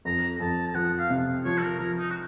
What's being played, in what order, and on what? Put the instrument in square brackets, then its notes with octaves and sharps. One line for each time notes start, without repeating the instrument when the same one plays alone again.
[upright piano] F2 [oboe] A#5
[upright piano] F2 [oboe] A5
[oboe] A5
[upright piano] F3 [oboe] F#5
[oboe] F5
[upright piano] C3
[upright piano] F3 [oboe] C#5
[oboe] A4
A#4
[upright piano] F3 [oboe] A#4
[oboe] D#4
F#4